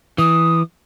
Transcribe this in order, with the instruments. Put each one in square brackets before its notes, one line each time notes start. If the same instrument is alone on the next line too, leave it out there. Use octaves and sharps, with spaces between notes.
[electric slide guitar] E3 [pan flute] D#6